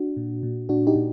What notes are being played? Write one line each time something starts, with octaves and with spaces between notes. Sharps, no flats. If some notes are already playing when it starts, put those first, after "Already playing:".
Already playing: D4 F#4
A#2
A#2
A#2 D4 F#4
D#4 G4
A#2